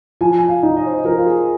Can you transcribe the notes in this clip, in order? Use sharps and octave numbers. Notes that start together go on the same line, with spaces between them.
F3 G#5
G#5
F5
D#4
D#5
C5
D#5
F3 A#4
F4
G#4